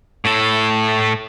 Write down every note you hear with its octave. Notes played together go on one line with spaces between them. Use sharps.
A2 A4